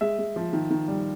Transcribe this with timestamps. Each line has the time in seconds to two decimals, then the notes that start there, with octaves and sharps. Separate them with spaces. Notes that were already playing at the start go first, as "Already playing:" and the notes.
0.01 G#3 E5
0.19 G#3
0.36 F3
0.53 D#3
0.70 D#3
0.88 G3